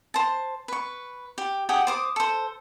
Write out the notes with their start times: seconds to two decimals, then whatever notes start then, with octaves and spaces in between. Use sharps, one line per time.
0.14 C5 A5
0.68 B4 C#6
1.38 G4
1.69 G4 G#4 F#5 G5
1.87 C5 D6 D#6
2.16 A4 C5